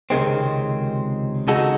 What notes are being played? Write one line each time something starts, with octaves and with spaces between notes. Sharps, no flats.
C#2 C3 D#3 G#3 C4
C#3 G#3 D#4 F#4 A4